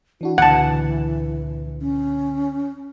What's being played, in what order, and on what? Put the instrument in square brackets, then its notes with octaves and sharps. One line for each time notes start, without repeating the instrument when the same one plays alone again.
[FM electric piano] E3 D4 F#4 [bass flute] E4
[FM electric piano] C#2 A#2 D3 [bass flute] E3 [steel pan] F#5 A5
[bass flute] C#4